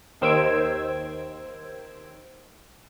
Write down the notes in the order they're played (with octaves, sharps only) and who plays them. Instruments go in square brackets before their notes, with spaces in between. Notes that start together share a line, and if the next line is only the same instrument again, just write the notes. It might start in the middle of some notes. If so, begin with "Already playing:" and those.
[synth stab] D#2 D#3 C5 E6 G#6 D7